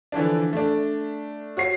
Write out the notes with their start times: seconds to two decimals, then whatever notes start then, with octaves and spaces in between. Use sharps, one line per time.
0.12 D3 E3 F3 D4
0.53 A3 D4
1.57 F#4 C#5 C7